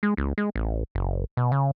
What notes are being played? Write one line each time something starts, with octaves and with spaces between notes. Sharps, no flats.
G#3
C#2
G#3
A1
F#1
B2
C#3